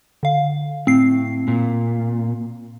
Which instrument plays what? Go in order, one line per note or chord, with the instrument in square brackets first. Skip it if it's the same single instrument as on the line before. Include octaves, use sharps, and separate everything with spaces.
[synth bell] D3 F5
[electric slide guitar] A2 [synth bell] C4 C7
[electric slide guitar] A#2